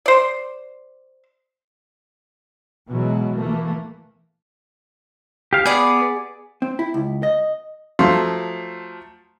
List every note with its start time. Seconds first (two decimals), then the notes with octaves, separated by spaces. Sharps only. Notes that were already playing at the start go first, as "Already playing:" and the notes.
0.06 C5 D5
2.88 B2 E3 F#3 G#3
3.36 E3 A3 A#3
5.53 G4 F5
5.66 B3 G#4 D5
6.62 C4
6.79 E4
6.94 C#2
7.23 D#5
7.99 F3 F#3 A3 F5 C6